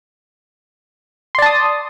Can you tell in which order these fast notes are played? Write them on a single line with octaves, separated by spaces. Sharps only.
C6 D5 A5 D#6